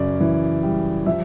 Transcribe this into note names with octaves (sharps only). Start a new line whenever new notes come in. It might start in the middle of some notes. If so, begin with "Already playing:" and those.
Already playing: F#2 C#3 D5
E3
G3
F3 E5